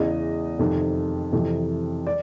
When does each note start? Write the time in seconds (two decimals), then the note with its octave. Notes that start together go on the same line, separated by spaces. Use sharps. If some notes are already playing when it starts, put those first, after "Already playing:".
Already playing: E2 C#3 E3 D#5
0.59 F2 C3 D#3
1.33 F2 C3 E3
2.07 D5